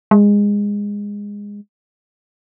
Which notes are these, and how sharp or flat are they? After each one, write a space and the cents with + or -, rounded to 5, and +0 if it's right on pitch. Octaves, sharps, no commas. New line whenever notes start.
G#3 -20